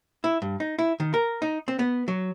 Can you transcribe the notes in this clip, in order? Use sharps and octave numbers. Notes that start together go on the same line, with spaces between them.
E4
G2
D#4
E4
D#3
A#4
D#4
C4
B3
F#3